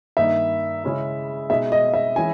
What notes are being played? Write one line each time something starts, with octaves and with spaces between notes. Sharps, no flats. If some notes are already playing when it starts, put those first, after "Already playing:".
G2 D#3 A#3 D#4 E5
C#3 G#3 C#4 E4
B2 G#3 D#4 E5
D#5
E5
E3 G#3 C#4 E4 G#5